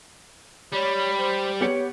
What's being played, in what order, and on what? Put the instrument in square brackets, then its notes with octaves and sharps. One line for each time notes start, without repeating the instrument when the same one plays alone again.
[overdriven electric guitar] G3 [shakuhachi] C#5 [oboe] B5
[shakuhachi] C5
[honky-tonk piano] B3 G4 C#7 [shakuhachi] C#5